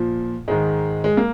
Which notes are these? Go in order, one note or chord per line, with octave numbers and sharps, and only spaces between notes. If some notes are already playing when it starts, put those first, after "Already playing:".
Already playing: A#2 F3
G#2 D#3 G#3
G#3
A#3